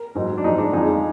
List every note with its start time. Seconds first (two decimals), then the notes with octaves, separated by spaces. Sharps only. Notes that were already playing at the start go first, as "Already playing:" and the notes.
Already playing: A#4
0.15 G#2 F#3
0.38 D4
0.44 G#2 F3 G#3 D#4
0.58 D4
0.73 F2 F3 G#3 D#4